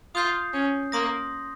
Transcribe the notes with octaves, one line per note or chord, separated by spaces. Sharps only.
F4 D#6 G6 C7
C#4
A#3 C6 D#6 A#6